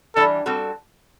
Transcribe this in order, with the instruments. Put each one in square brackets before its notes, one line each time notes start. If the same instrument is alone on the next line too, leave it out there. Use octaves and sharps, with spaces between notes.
[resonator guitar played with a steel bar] E3 G3 D4 G4 [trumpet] A4
[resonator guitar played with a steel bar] G3 C4 F#4 A4